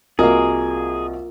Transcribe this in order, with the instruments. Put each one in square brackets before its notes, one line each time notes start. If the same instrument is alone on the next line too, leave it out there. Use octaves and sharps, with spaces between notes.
[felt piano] C2 F#4 D#5 [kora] A#3 A#4 [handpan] F4 [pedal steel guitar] G#4